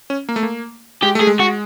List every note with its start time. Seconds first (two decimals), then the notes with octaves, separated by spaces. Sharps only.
0.10 C#4
0.29 A#3
0.36 A3
0.43 A#3
1.03 G#3 G4
1.15 A3
1.21 G#4
1.27 G#3
1.40 F#4